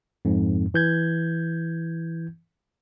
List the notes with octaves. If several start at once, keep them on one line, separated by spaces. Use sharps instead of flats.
F2 G#2
E3 G6 G#6